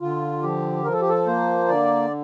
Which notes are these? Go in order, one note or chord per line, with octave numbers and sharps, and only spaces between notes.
D3 F4
F3 G4
F3 A#4
A4
G4
A4
A#3 C5
D3 D5